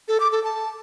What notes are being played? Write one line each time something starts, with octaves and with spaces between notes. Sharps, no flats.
A4
D6
A4
A5